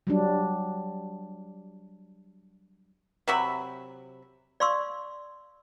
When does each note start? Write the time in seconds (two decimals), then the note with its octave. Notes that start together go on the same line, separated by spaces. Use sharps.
0.07 F#3 G3 D4
3.28 C3 F#3 E5 B5
4.60 D5 F5 C6 C#6 E6